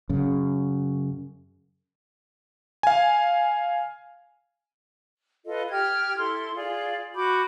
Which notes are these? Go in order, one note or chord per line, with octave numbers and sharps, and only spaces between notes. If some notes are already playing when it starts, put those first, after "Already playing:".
F#2 C#3
F5 G#5
F4 A4 B4 D#5
G4 G5 F6 G#6
E4 A4 C6
F4 G#4 D5
F#4 B5 D6 G6